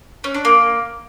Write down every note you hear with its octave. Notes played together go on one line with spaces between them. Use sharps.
C#4
D4
A#3